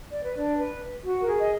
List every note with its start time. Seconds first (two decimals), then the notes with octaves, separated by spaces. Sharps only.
0.10 D5
0.23 B4
0.35 D4 D5
0.57 B4
1.04 F#4
1.22 A#4
1.27 G#4
1.39 D#5